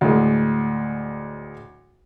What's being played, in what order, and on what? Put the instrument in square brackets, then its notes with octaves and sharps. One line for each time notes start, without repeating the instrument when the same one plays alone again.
[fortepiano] D2 A2 G#3